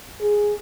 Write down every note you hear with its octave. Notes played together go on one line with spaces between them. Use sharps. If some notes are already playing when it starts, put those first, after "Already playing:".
G#4